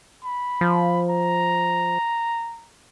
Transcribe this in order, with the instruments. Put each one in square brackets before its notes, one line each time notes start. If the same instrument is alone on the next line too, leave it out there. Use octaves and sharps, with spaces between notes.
[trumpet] B5
[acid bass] F3
[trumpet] A#5